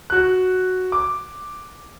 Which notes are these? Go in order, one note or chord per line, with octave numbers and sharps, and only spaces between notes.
F#4 F#6
D6